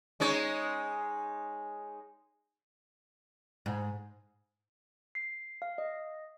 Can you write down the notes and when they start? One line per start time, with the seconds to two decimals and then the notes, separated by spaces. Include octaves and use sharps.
0.20 G#3 D#4 C#5
3.66 G#2
5.15 C7
5.62 F5
5.78 D#5